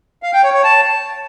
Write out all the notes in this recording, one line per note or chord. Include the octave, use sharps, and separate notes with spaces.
F5
G5
C#5
C#5
A5